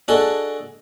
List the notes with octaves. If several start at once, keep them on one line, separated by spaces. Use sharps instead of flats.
D4 F#4 G#4 A4 D#5